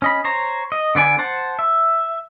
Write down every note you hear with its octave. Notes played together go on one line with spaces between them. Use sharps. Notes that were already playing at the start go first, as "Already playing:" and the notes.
C#4 D#5 B5
C5 C#5 A#5
D#5
D3 B3 D5 G#5
C5 F#5 A5
E5